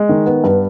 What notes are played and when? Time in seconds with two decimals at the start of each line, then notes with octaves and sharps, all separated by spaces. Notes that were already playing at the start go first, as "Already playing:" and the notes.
Already playing: G#3
0.09 D#3
0.26 B3
0.44 G2